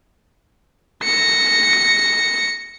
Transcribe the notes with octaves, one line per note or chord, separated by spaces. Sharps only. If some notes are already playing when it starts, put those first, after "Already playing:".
A#6 C#7